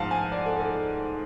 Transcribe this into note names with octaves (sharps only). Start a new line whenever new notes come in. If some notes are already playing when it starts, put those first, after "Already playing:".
Already playing: G#2 F3 F5 F#5 A5
G#5
D5
A4
A4